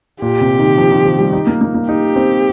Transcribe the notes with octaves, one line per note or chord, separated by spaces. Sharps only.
A#2 G4
C3
D#3
F3
D#3
F3
G3
D#4
A#3
A#3
A#3
D#4 G4
C4